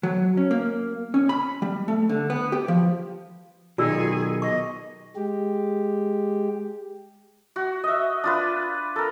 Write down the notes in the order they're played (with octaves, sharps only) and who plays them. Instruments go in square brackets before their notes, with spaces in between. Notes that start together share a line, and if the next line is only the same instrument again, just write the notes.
[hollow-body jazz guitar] F#3
C#4
A#3
C#4
B5
G3
A3
D3
B3
G4
F3
[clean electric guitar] B1 D#3 [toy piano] F4 D5 E6 [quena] G#4
[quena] D#5 [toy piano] C#6
[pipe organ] G#3 G4
[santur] F#4
D#5 E5
D4 F4 B4
A4 A#4